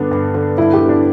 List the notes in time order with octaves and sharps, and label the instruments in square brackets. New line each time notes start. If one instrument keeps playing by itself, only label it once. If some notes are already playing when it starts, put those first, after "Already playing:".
Already playing: [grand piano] G2 D3 B3 [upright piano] D4
[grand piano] G2
D3 B3
[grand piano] G2 [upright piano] E4
[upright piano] G4
[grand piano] D3 B3
[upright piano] D4